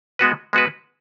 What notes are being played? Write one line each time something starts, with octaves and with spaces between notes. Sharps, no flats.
G#3 B3 F#4 B4
G#3 B3 F#4 B4